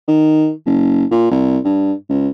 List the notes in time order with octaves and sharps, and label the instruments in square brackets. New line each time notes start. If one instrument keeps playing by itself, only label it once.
[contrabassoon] D#3
F#1
A#2
C2
G2
C#2